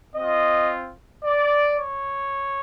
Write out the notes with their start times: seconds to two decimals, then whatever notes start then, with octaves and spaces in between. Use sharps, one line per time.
0.15 C4 F4 D#5
1.25 D5
1.78 C#5